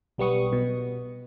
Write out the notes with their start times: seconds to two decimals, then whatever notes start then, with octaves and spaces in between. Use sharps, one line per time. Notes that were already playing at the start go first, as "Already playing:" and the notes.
0.18 B1 G3 B3 C#6 D#6
0.53 B2